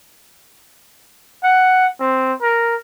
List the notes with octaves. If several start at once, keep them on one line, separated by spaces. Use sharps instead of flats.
F#5
C4
A#4